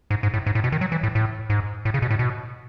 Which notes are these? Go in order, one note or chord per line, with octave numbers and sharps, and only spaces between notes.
G#2
G#2
A2
G#2
A2
B2
D#3
F#3
E3
A2
A2
G#2
A2
C#3
B2
A2
B2